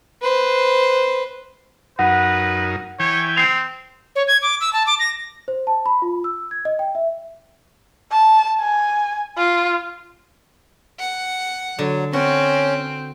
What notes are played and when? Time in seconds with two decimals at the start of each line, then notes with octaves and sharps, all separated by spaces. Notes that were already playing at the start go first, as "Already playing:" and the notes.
0.21 B4 C5
1.99 F#2 D#4 A#4 B4 F#5
3.00 E3 C#5 G5 G#5
3.36 C4 C7 F7
4.16 C#5
4.27 G#6
4.42 D6
4.61 E6
4.73 A5
4.87 D6
4.99 A#6
5.48 C5
5.67 A5
5.86 B5
6.02 F4
6.24 E6
6.51 G#6
6.65 D#5
6.79 G5
6.95 E5
8.11 A5
8.60 G#5
9.37 F4
10.99 F#5
11.79 D3 F#3
12.13 C4 C#4 F#4